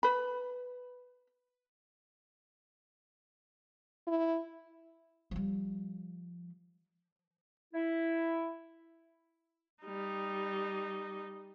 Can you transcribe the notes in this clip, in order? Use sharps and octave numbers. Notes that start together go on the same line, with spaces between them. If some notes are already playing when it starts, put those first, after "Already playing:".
B4 B5
E4
F3 G3
E4
G3 D#4